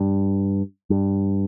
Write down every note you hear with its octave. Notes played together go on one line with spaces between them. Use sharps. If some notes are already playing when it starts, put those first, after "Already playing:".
Already playing: G2
G2